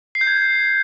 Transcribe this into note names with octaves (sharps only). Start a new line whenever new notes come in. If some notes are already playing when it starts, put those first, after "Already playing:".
C7
G6
G#6